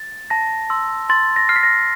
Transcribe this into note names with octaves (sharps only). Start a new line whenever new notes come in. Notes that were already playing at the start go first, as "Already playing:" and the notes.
Already playing: A6
A5 A#6
C6 E6
C6 A6
A#6
F6 C7
B6
A#6